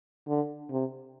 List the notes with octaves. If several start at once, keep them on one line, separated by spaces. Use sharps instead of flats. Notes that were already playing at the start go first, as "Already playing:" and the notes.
D3
C3